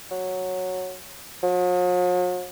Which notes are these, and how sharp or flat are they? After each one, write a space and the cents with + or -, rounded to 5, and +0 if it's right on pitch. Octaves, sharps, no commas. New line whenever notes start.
F#3 -5
F#3 -45